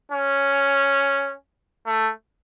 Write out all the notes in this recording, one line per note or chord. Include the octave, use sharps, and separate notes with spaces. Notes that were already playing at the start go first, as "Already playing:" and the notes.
C#4
A3